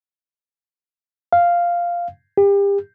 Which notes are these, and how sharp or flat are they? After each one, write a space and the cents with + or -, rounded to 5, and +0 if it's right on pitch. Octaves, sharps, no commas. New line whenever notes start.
F5 -5
G4 +35